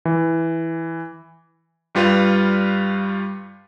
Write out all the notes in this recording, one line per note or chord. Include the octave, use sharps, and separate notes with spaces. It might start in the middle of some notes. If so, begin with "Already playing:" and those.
E3
G2 G3 F4 B4 F5